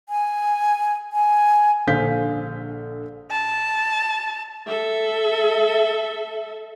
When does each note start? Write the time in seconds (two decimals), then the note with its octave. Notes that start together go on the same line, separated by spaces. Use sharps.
0.09 G#5
1.12 G#5
1.87 A#1 D3 C5 F5 G6 B6
3.31 A5
4.68 A4 E5